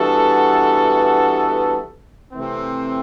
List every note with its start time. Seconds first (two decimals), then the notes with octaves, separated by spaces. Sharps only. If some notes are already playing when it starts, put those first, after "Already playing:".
Already playing: G2 E3 B3 F#4 A4
2.33 C3 E3 A3 C4